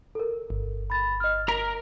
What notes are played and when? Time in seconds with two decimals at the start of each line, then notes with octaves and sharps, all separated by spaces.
0.15 A4 A#4
0.50 G1
0.90 B5 A6
1.20 D#5 F6
1.48 A#4 A#5 B6